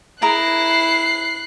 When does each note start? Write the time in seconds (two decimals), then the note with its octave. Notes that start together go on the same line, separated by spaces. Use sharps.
0.22 E4 G#4 A#4 A#5 F#6 C7